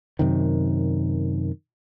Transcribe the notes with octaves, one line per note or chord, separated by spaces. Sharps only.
F#2 C3 D#3